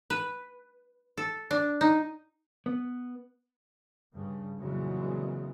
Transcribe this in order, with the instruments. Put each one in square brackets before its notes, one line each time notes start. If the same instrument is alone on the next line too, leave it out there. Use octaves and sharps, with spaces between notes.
[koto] B4
A4
D4
D#4
[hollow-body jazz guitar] B3
[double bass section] G2 C#3
F2 A#2 C#3 E3 F#3 G#3